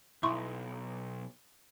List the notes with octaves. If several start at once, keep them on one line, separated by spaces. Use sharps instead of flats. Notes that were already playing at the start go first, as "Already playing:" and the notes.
B1 E4 C6 C#6